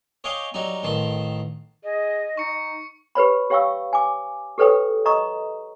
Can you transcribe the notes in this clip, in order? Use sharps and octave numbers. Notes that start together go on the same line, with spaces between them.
C#5 D#5 F5 G5 G#5 D6
F#3 G3 D#4
A1 D#3 A5 C6
G#4 D#5
D#4 C#6 C#7
G4 B4 C#5 B5
G4 C#5 F5 G5 C#6 E6
G#5 D6
G4 A4 B4 C#5 G5 D#6
D#5 A#5 C#6 D#6